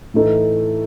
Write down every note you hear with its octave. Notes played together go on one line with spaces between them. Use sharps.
A2 E3 A3 D#4 A4